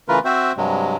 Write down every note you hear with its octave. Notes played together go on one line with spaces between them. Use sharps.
C#3 E3 A3 F4 A#4 B4
C4 F#4 C5 E5
G2 C3 F#3 G#3